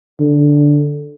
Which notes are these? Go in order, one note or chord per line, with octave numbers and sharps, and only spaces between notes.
D3